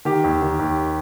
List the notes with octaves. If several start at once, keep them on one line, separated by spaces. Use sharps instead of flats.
D#3 G4
D#2
D#3
D#2